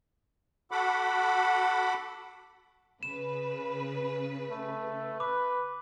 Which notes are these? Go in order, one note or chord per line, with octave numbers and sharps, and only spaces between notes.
F#4 A4 F#5 B5 D6
C#3 B4 E7
A3
B4 D6